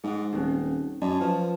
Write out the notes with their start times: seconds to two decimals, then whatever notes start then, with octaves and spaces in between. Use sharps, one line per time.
0.04 G#2 G#4 F#5
0.33 D#1 C4 C#4 D#4
1.02 F#2 D5 D#5 A5
1.20 F3 B4